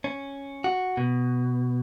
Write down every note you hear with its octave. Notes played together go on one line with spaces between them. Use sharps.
C#4
F#4
B2